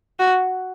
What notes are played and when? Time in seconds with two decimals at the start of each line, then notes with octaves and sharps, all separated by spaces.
0.19 F#4